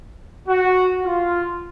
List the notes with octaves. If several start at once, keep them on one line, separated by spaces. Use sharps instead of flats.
F#4
F4